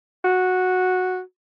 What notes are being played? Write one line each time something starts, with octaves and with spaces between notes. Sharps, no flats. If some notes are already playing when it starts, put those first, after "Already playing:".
F#4